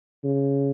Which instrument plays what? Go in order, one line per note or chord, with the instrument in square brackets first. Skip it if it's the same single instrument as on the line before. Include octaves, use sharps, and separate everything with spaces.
[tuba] C#3